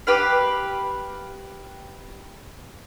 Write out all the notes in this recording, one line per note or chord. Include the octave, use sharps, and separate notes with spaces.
G4 B4 F5